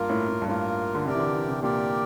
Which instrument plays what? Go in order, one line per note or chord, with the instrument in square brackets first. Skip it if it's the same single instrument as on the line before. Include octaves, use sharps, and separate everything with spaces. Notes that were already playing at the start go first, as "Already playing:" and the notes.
Already playing: [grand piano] G2 [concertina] A#3 F4 A#4
[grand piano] A2
A2
G2
[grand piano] A2 [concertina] A#3 F4 A#4
[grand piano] D3
[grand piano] C3 [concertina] G4 A#4 D5 G5
[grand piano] E3
D3
E3
C3
[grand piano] A#2 [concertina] G4 A#4 D5 G5